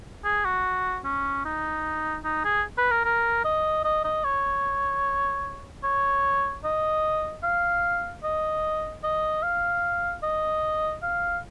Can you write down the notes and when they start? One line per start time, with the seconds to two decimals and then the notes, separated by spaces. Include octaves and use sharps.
0.25 G#4
0.45 F#4
1.04 C#4
1.45 D#4
2.24 D#4
2.44 G#4
2.78 B4
2.91 A#4
3.05 A#4
3.45 D#5
3.84 D#5
4.04 D#5
4.24 C#5
5.84 C#5
6.64 D#5
7.43 F5
8.23 D#5
9.04 D#5
9.43 F5
10.23 D#5
11.03 F5